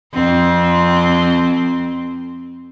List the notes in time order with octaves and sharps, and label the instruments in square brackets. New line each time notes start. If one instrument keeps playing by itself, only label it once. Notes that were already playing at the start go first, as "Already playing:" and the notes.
[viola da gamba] F2 C4